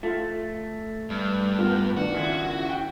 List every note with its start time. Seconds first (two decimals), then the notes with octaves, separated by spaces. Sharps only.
0.03 A3 F4
1.10 G2
1.58 B3 F4 A#4
1.97 D#3 D4 F#4
2.14 C#3 E4 F4
2.69 G5